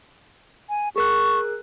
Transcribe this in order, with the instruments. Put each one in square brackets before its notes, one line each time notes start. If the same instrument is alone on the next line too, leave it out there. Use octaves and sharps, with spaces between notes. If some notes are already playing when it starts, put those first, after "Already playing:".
[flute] G#5
[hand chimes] G#4 A#4 F#6 [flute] C#6